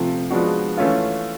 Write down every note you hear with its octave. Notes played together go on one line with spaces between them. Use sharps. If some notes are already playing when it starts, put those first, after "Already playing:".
Already playing: C3 F3 A3
F3 G#3 B3 D4 F#4
E3 A3 C#4 F4